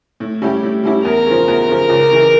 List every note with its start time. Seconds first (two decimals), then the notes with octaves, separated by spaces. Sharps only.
0.20 A2
0.42 G3 C#4 E4 G4
0.63 A2
0.83 G3 C#4 E4 G4
1.05 E2 A#4
1.26 C#3 F3
1.48 E2
1.69 C#3 F3
1.89 C#2
2.11 C#3 E3